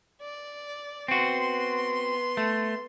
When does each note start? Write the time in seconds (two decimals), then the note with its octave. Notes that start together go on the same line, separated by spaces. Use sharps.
0.21 D5
1.08 B3 C4 F#4 C6
2.37 A3